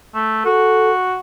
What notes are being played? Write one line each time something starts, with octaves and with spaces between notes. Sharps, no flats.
A3
F#4 A4